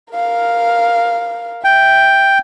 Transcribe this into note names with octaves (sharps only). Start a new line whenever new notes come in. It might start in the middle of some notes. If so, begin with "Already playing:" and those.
A#4 F5
E5 G5